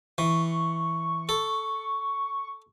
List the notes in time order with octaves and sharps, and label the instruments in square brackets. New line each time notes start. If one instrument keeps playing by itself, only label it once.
[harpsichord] E3 [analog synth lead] C#6
[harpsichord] A4